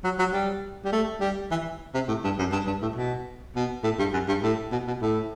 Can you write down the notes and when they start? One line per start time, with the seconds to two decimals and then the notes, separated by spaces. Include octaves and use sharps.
0.04 F#3
0.19 F#3
0.33 G3
0.84 G3
0.92 A3
1.20 G3
1.51 E3
1.94 C3
2.08 A2
2.24 G2
2.39 F#2
2.52 G2
2.67 G2
2.82 A2
2.96 B2
3.55 B2
3.84 A2
3.99 G2
4.13 F#2
4.28 G2
4.43 A2
4.72 B2
4.87 B2
5.01 A2